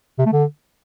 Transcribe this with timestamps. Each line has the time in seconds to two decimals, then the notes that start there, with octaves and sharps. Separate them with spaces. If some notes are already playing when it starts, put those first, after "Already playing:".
0.19 C3
0.26 A3
0.33 D3